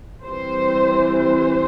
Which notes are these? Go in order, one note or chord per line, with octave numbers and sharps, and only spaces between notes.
E3 G3 C4 C5
C5